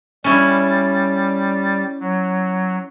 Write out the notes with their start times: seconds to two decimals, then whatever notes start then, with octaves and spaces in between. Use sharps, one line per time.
0.24 G3 C#4 E4 A6
2.00 F#3